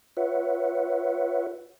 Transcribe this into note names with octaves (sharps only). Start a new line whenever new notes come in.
F4 B4 C#5 E5 F#5